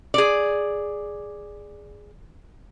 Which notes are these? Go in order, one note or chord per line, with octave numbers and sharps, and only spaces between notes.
G#4 D5